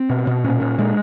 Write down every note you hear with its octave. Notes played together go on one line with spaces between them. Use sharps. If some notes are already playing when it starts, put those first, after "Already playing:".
Already playing: C4
B2
B2
A#2 C#4
A#2
A#2 G#3